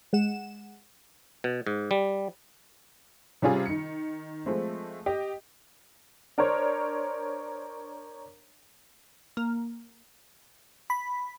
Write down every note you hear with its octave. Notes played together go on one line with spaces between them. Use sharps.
G#3 F#5 E7
B2
G#2
G3
C3 G3 C#4 F4 G#4
D#3 C#7
F3 G#3 A3 C4
G4 D#5 G5
D4 A#4 C5 C#5
A#3
B5